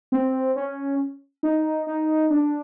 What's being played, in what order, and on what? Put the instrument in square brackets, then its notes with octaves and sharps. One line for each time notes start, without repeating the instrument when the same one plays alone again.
[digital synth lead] C4
C#4
D#4
D#4
D4